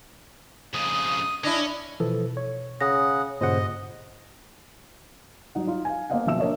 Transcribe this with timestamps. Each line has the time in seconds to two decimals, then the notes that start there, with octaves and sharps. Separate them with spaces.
0.74 F2 C#3 D#6
1.44 C#4 D4 E4 D#5
2.00 B2 E3 F3 A4
2.37 C#5
2.81 C#3 G#4 F#5 A#6
3.41 G2 A#2 C#3 C5 D#5 F#5
5.55 F#3 D#4 F#5
5.67 D#4 F4
5.85 F5 G#5
6.10 A#3 B3 C5 D#5 F5 F#5
6.26 B1 B2 F3 E5 E6 E7
6.39 A#3 D4 A#4 C#5 D#5 E5